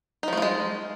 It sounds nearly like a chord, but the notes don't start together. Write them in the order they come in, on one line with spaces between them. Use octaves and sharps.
D#4 F3 A3 F4 G#3